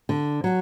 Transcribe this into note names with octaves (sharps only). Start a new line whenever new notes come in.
D3
F#3